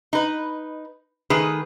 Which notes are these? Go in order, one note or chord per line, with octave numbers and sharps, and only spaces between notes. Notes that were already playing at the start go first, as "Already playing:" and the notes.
D#4 B4
D#3 A3 G#4 B4